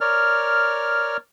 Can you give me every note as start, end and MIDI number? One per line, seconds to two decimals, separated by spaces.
0.01 1.17 70
0.01 1.17 73
0.01 1.17 74
0.01 1.17 89